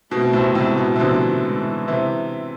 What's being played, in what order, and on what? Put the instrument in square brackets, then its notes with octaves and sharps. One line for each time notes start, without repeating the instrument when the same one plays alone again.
[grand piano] B2 [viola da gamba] A3 C4
[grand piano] A2 C3
[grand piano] A2 C3 [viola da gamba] G#3 B3
[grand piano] B2
C3
[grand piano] B2 D3 [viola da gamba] F3 A3
[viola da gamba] E3 G#3
[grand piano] C3 E3